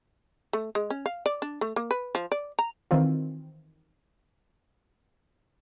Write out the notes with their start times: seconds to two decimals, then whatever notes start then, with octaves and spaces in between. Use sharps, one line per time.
0.53 A3
0.75 G#3
0.90 C#4
1.06 F5
1.26 D5
1.42 D4
1.61 A3
1.76 A#3
1.91 B4
2.15 F3
2.32 D5
2.59 A#5
2.91 D#3 E3 C4 F4